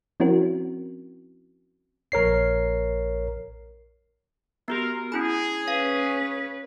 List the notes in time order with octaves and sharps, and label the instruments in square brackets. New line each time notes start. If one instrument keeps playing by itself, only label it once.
[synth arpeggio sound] F3 C4 C#4 E4 F#4 A#4
[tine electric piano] A#1 A#4 C#5 C7
[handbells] B3 F#4 G4 [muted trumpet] A#4
[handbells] C#4 E4 B5 [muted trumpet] G#4
[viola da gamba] C#4 B4 [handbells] F5